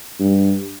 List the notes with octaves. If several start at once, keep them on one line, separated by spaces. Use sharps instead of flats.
G2